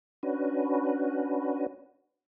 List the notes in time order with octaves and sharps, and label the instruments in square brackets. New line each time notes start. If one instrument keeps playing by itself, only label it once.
[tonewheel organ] C#4 D4 F#4 B4